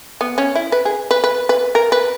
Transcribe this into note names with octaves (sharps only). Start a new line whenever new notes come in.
B3
C#4
E4
B4
G#4
B4
B4
B4
A#4
B4